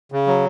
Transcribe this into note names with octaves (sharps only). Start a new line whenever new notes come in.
C#3
F#3